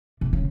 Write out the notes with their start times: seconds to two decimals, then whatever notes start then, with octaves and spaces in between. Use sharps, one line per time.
0.21 C3
0.33 C#3